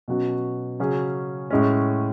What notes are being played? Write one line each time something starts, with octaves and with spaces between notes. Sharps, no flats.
B2 F#3 C#4 F#4
C#3 F#3 C#4 G#4
A2 G#3 C#4